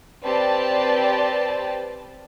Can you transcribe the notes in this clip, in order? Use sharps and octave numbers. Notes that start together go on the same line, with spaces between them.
C4 G4 B4 D5 A5